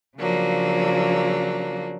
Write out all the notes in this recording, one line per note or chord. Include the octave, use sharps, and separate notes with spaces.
C#3 F3 F#3 A#3 D4